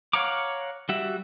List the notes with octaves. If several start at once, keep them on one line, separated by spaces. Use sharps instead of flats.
C#5 F5 F#5 A#5 D6
G3 F#4 E5